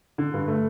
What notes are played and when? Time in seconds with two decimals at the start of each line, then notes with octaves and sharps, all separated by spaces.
0.18 D3
0.34 G2
0.48 A3